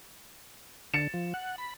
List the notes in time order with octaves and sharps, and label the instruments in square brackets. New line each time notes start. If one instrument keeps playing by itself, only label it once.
[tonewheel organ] D3 [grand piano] A6 C#7 E7
[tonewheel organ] F3
F#5
B5